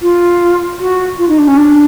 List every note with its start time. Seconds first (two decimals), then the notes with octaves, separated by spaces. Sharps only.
0.02 F4
0.80 F#4
1.18 F4
1.28 D#4
1.38 D4
1.47 C#4
1.57 D4